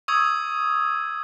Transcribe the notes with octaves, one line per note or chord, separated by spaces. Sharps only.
C#6 D#6 E6 G#6